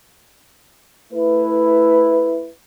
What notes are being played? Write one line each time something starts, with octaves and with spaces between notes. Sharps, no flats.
A3 E4 B4